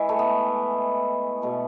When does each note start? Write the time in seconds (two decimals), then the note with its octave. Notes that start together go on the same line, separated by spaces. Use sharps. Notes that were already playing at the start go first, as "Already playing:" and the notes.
Already playing: E3 G#3 E4
0.09 A3
0.19 B3
1.42 B2 A3